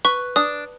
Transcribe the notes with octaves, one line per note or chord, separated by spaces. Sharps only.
B4 C#6
D4 D#6